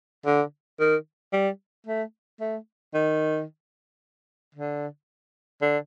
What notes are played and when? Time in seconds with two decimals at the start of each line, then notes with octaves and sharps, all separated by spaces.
0.26 D3
0.80 D#3
1.33 G3
1.87 A3
2.40 A3
2.94 D#3
4.55 D3
5.62 D3